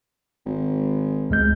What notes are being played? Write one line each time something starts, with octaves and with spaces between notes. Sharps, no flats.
G#1
C#2 G#3 G6